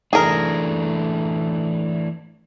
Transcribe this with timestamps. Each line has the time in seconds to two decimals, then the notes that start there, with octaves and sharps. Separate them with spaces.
0.13 E3 A3 D4 G#4 A#4